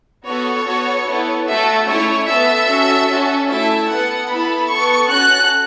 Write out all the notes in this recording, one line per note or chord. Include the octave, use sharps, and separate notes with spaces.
B3 F#4 A4 C#5
B3 F#4 A4
B3 E4 A4
A3 F#4 A4 E5
A3 C#4 E4 C#5
B3 A4 E5
C#4 F#4 A4
C#4 F#4 A4
A3 E4 A4 E5
B3 A4 F#5
B3 E4 A4 B5
B3 A4 C#6
C#4 F#4 A4 F#6